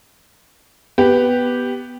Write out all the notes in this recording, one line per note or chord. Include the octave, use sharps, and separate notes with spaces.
B3 G4